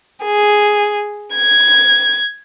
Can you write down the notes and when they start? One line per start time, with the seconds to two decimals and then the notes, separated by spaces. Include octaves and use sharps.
0.24 G#4
1.34 G#6